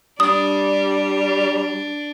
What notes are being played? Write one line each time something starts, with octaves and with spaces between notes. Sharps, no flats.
G3 D4 D#6